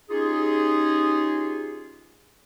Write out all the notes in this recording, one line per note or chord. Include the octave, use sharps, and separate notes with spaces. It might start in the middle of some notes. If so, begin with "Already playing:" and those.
C#4 D#4 F4 G4 G#4